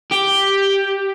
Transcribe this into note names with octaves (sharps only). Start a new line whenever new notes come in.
G4